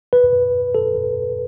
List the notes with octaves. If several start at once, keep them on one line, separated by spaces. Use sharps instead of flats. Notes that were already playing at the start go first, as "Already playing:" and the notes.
B4
A4